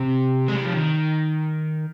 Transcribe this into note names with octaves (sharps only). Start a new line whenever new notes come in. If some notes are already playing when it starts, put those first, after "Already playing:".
Already playing: C3
G#3
G3
F3
D#3